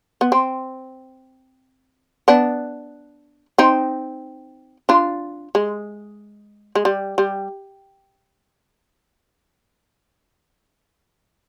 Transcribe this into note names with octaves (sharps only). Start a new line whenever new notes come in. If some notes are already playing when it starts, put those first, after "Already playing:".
B3
C4
B3 D4
C4 D#4
D4 F4
G#3
G#3
G3
G3